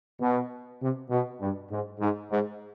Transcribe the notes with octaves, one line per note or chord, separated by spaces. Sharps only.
B2
C3
B2
G2
G#2
G#2
G#2